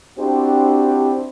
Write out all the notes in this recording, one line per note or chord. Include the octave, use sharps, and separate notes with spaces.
C4 D4 E4 F#4 G4 C5